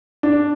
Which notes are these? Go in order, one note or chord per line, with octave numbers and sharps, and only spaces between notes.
D4